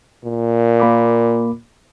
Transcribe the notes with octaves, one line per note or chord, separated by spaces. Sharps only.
A#2
A#3 B5 D6